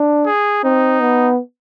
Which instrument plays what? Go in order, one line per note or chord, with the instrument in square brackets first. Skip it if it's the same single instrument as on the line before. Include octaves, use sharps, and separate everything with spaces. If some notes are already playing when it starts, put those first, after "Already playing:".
Already playing: [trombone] D4
[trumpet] G#4
[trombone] C4 [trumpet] D#4
[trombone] B3